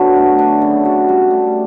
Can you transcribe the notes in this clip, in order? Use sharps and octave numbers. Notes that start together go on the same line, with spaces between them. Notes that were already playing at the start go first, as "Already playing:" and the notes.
Already playing: D3 F#3 B3 F#4
A3
D4
C#3
F#4
G3
A3